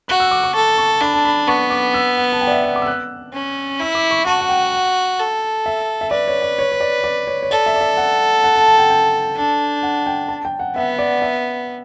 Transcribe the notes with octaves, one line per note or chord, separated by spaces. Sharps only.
F#4 F#6
E6
D6
C#6
A4
C#6
D4 B5
A5
B5
B3 C#6
D6
E6
F#5
A5
G5
D5
E5
F#5
D6
E6
F#6
C#4
E4 E6
D6
C#6
F#4 A5
F#5
G5
A4
E5
E5
B4 D5
C#5
D5
C#5
C#5
D5
D5
C#5
C#5
A4 D5
E5
D5
E5
F#5
F#5
A5
A5
G5
G5
D4
F#5
G5
A5
G5
F#5
B3 E5
D5
E5